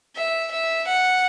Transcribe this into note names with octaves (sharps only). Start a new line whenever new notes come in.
E5
E5
F#5